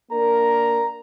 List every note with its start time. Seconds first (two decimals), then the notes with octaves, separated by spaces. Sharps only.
0.12 A#3 D4 A#4 A#5